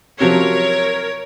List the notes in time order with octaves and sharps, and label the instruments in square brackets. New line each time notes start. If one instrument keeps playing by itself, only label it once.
[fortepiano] C3 F3 F#3 [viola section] A#4 C#5